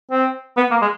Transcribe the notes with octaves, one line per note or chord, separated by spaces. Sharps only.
C4
B3
A#3
G#3